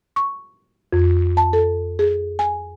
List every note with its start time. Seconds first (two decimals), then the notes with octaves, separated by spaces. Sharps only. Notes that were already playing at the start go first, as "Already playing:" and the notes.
0.16 C#6
0.93 F2
1.37 A5
1.53 A4
1.99 G#4
2.39 G#5